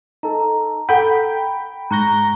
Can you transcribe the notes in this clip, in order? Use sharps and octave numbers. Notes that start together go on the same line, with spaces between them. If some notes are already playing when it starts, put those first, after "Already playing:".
D#4 A4 A#5
A4 F#5 G5 B5
G#2 A#5 C#6 F#6 A#6 G7